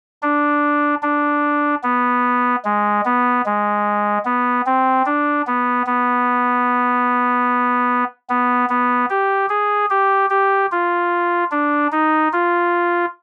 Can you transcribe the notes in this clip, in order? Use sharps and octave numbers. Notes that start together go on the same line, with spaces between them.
D4
D4
B3
G#3
B3
G#3
B3
C4
D4
B3
B3
B3
B3
G4
G#4
G4
G4
F4
D4
D#4
F4